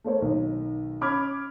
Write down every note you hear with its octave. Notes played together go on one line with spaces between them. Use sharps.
A3 A#3 C5 C#5
B1 D#3
C#4 B5 D6 F6 G#6